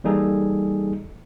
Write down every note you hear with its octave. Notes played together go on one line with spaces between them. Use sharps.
E3 G3 A#3 D#4 G#4 A4